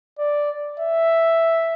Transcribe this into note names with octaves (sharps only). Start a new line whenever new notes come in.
D5
E5